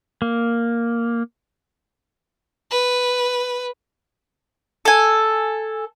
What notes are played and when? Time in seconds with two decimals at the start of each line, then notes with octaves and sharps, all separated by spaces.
0.22 A#3
2.71 B4
4.85 A4 G#5